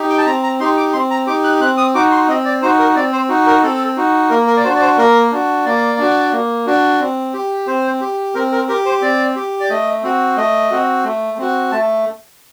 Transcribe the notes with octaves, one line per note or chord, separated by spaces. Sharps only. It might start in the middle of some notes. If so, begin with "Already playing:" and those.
Already playing: D#4 G4
G5
A5
C4 A#5
A#5
D#4 G4 C6
D6
C4 C6
A#5
D#4 G4 D6
F#6
C4 F#6
D#6
D#4 F#4 D6
C6
C4 D#5
D5
D#4 F#4 C5
A#4
C4 D5
C5
D#4 F#4
A#4
C4 A4
D#4 F#4
A#3 A#4
A#4
D5
D4 F#4 C5
D5
C5
A#3 A#4
D4 F#4
A#3 D5
D4 F#4
A#3
D4 F#4
C4
G4
C4 C5
G4
C4 A#4
A#4
G4 A#4
C5
C4 D5
G4
D5
A3 D#5
C4 F#4
A3 D#5
C4 F#4
A3
C4 F#4
A3 A5